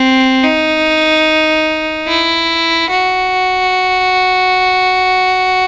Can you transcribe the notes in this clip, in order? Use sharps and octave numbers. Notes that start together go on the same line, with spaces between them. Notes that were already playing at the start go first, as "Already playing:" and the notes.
Already playing: C4
D#4
E4
F#4